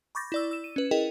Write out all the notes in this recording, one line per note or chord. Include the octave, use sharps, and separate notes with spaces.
B5 C#6 D6 G6 A6 A#6
E4 D5 E6
E6 E7
D#7
C#4 B4
E4 G#4 A#4 D#5 G5